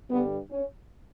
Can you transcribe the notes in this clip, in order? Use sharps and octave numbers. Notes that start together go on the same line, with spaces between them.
G2 D3 G3 B3
C#4